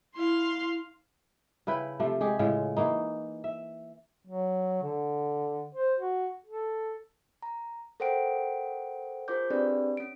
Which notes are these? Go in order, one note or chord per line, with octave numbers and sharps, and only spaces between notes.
E4 F5 C6
C#3 E4 B4 G5
C3 F3 A3
G#3 G4 G#4
A2 C#3 G#3 F4
E3 A#3 D#4
E5
F#3
D3
C5
F#4
A4
A#5
A4 A#4 C5 F#5 G5 D7
F4 G#4 A#4 C5 D6 G6
C4 D4 G4 G#4 B4 D5
C#4 D7